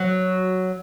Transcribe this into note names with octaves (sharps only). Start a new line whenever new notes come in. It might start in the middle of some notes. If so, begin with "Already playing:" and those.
Already playing: F#3